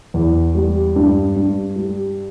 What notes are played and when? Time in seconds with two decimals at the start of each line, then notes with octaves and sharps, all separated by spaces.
0.14 E2
0.55 G3
0.96 G2
1.36 G2
1.76 G3